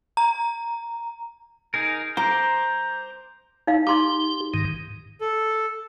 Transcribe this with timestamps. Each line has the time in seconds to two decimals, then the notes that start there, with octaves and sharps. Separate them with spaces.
0.17 A#5
1.74 D#4 G#4 A#4
2.17 C5 A#5 C6 D6
3.67 D#4 F5
3.87 D#4 G4 C6 D6
4.54 G#2 D#3
5.21 A4